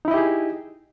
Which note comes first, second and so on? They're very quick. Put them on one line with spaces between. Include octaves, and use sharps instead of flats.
D#4 E4 D#5 G4 G#4